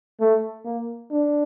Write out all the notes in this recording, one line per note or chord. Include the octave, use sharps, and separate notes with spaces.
A3
A#3
D4